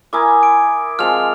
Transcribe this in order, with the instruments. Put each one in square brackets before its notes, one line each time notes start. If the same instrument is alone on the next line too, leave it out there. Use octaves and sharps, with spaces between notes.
[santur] E4 A#4 G#5 [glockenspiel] D6 D#6 G#6
[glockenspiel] D7
[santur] F3 G#3 C4 [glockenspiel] F6 F7